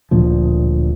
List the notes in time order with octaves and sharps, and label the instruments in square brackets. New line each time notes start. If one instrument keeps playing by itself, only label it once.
[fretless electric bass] D1 D2 A#2 F3